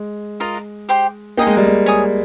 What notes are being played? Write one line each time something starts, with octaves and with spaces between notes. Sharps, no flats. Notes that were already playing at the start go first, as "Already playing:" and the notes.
Already playing: G#3
F4 A#4 D#5
G4 C5 G5 C6
A#3 D#4 G#4 D#5 G5
G#3
G3
G#3
C#5 G#5 D#6